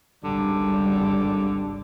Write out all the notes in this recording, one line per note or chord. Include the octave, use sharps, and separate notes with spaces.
G#1 C#2 D3 G3